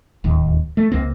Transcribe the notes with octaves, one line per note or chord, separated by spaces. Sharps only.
D1 D#2
A3
C#2 A#3 C4